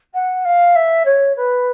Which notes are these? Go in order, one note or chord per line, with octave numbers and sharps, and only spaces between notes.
F#5
F5
E5
C#5
B4